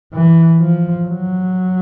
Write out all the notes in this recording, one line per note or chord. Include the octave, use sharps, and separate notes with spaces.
E3
F3
F#3